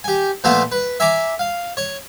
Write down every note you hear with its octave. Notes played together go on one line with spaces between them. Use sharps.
G4 G#5
A#2 F3 A3 B3 F4 A4
B4
E5 G#5 A#5 D6
F5
C#5